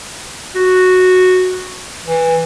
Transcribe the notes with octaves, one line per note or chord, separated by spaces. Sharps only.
F#4
E3